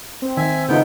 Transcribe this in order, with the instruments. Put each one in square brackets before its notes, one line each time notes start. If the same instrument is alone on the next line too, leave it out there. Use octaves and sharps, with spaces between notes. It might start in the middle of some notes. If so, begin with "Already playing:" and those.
[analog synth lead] C4
[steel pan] D#3 [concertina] E5 G#5
[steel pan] C#3 D#4 F4 [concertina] A3 B3 G5